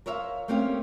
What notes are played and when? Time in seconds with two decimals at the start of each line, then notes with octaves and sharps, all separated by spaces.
0.06 A#4 C5 C#5 E5 F5
0.48 A3 A#3 C4 C#4 G4 F5